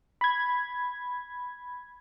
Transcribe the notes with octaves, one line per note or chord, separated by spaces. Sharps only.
B5 G#6